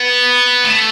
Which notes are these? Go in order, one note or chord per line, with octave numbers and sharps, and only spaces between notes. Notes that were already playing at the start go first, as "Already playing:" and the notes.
Already playing: B3
A3